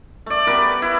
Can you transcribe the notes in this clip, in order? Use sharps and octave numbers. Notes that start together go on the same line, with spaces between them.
A3 D5
B3 G4 A#4 B4
E4